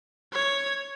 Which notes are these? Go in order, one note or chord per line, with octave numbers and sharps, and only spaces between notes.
C#5